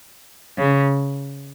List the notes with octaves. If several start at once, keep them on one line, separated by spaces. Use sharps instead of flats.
C#3